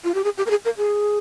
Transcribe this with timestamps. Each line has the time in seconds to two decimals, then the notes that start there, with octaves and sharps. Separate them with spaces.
0.04 F4
0.14 G4
0.24 G#4
0.38 G4
0.46 A#4
0.50 G#4
0.65 A#4
0.77 G#4